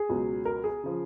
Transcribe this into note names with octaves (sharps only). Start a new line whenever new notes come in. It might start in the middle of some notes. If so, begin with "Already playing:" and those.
Already playing: G#4
C#2 B2 F#3
A#4
G#4
C#3 F3